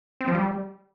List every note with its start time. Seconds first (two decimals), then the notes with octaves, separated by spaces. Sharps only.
0.21 C4
0.28 F3
0.35 G3